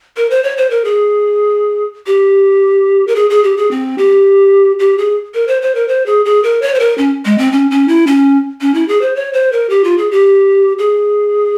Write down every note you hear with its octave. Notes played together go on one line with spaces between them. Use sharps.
A#4
C5
C#5
C5
A#4
G#4
G4
A#4
G#4
G#4
G4
G#4
C4
G4
G4
G#4
A#4
C5
C5
A#4
C5
G#4
G#4
A#4
C#5
C5
A#4
C#4
G#3
C4
C#4
C#4
E4
C#4
C#4
E4
G#4
C5
C#5
C5
A#4
G4
F4
G#4
G4
G#4